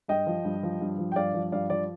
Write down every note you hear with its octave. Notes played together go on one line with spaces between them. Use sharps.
G2 D#5 G5
F3
G2
F3
G2
F3
G5
G2 D5 F5
F3
G2 D5 F5
F3 D5